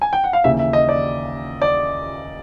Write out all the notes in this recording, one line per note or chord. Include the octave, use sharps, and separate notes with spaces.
G#5
G5
F#5
F5
D#2 C#3 E3 E5
E5
D#5
D5
D5